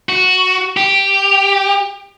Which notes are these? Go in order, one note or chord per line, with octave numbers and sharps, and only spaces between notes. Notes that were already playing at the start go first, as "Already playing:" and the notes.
F#4
G4